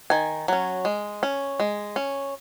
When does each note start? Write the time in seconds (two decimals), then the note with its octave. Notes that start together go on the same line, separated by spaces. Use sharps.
0.10 D#3 G#5
0.48 F#3 C#4
0.85 G#3
1.23 C#4
1.60 G#3
1.96 C#4